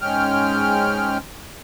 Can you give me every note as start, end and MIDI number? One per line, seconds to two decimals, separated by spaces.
0.02 1.18 44
0.02 1.18 56
0.02 1.18 61
0.02 1.18 79
0.02 1.18 89